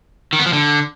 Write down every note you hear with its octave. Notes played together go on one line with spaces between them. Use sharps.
D#3
B3
F3
D3